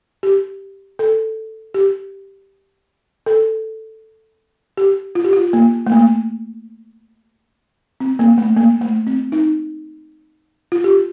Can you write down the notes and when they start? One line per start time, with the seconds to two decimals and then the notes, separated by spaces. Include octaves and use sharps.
0.23 G4
0.99 A4
1.74 G4
3.26 A4
4.77 G4
5.15 F4
5.24 G4
5.33 F4
5.53 A#3
5.86 A3
5.92 A#3
8.00 C4
8.19 A#3
8.38 A3
8.56 A#3
8.81 A3
9.07 C4
9.32 D#4
10.72 F4
10.84 G4